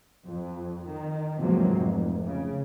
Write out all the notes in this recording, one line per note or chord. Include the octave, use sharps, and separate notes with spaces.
F2
D#3
E2 G#2 C3 F3 F#3 A#3
F1
C#3